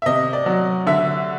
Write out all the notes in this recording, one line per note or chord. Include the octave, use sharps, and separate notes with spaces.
E5
C3 D#5
D5
F#3
D3 E5